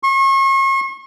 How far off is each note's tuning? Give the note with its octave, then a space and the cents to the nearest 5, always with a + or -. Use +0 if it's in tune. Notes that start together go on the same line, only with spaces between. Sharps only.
C#6 -40